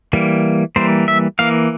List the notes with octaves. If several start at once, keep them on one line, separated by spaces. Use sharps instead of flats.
E3 G3 A#3
E3 G3 A#3 C5
E5
E3 A#3 F5